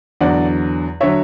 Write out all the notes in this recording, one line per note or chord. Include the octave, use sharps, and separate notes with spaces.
E2 D3 F#3 D5 F#5
D3 F#3 C#5 E5